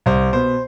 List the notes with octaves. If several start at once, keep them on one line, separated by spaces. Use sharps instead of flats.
C2 C5
B2 B3 C5